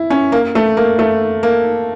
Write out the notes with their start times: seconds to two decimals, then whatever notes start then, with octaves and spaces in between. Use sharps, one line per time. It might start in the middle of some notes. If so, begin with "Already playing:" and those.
Already playing: E4
0.10 C#4
0.32 A#3
0.55 A3
0.77 A#3
0.99 A3
1.43 A#3